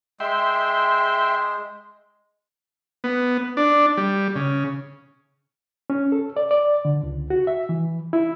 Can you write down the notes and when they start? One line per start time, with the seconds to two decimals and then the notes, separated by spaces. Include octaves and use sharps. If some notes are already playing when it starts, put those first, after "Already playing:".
0.20 G#3 E5 G5 C6
3.04 B3
3.57 D4
3.97 G3
4.36 C#3
5.90 C#4
6.12 A4
6.37 D5
6.51 D5
6.85 D3
7.03 C#2
7.30 F#4
7.47 E5
7.69 E3
8.13 E4